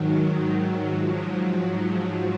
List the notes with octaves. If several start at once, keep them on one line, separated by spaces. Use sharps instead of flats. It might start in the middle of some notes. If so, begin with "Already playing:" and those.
Already playing: G#2 D#3 F#3
G#2 F3